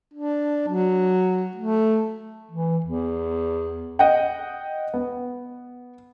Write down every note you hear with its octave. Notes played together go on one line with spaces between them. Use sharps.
D4
F#3
A3
E3
E2
D#5 F#5 G5
B3